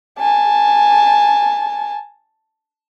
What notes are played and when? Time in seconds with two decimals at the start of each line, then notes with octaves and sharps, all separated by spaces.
0.19 G#5 A5